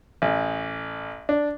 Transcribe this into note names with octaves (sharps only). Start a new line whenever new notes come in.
A1
D4